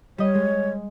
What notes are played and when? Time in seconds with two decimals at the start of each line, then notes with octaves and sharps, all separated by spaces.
0.18 G3 C#5 D#5
0.35 G#3